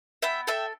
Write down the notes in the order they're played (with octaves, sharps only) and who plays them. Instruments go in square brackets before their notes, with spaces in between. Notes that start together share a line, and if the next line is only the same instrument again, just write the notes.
[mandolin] B3 E5 G5
A4 E5 G5